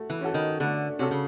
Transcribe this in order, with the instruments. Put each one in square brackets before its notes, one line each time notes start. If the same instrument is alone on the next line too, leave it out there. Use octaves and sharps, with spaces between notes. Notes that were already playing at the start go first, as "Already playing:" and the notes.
Already playing: [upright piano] A3 F#4
[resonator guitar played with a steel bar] E3
[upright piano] C#4 F#4 A4
[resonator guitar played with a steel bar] D#3
[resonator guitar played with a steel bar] D3 [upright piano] A3
[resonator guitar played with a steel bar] C3 [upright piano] C#4 F#4 A4
[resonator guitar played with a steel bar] C#3